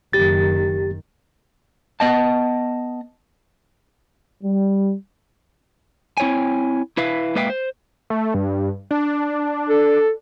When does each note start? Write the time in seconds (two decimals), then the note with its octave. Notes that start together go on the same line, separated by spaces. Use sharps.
0.13 F#1 D#3 G4 A6
2.00 B3 D#5 A5
4.44 G3
6.17 C4 E4 C#5 G5 G#5
6.97 E4 B4 E5 F5
7.35 G#3 A#3 B4 E5 F5 G5
7.50 C5
8.10 A3
8.34 G2
8.91 D4
9.69 A4